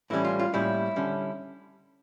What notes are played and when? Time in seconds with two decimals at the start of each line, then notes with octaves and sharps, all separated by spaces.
0.10 A2 E3 G3 C#4 E4
0.25 F4
0.39 F4
0.53 A2 G3 A#3 C#4 E4
0.96 D3 G3 C#4